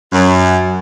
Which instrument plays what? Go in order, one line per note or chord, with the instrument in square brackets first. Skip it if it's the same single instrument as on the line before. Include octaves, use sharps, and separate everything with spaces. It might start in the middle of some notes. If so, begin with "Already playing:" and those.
[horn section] F#2